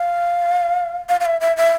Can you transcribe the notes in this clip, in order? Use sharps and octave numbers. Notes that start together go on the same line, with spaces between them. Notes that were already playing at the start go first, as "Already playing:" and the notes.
Already playing: F5
F5
F5
E5
E5
E5